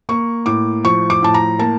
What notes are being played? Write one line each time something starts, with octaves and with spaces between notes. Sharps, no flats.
A#3 C#6
A2 D6
F3 C#6
D6
A2 A5
A#5
A#3 A5